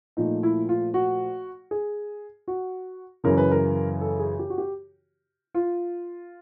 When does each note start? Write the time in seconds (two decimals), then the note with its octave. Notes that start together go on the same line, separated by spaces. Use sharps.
0.17 A#2 F3 A3 D#4
0.43 E4
0.69 F4
0.94 F#4
1.71 G#4
2.48 F#4
3.24 F#2 C#3 E3 A#4
3.37 B4
3.51 A#4
4.01 A4
4.19 G#4
4.39 G4
4.50 F#4
4.58 G4
5.54 F4